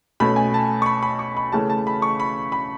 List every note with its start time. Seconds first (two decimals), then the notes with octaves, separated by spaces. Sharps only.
0.20 B2 A3 C#4 B5
0.36 G#5
0.54 A5
0.82 C#6
0.86 B5
1.03 B5
1.19 C#6
1.37 B5
1.52 C#3 E3 A3 C#4 A5
1.70 A5
1.87 B5
2.02 C#6
2.20 B5
2.52 B5